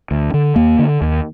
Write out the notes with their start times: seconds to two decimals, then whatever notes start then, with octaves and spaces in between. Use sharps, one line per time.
0.11 D2
0.34 D3
0.56 D#2 A#3
0.79 D3
1.01 D#2